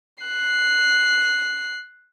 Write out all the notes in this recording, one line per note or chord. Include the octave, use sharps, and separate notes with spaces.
F#6 C7